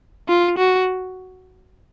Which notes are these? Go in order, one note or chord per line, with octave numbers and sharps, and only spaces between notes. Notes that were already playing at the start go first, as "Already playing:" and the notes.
F4
F#4